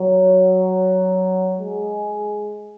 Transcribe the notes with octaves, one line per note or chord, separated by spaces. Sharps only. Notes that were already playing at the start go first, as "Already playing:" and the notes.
Already playing: F#3
G#3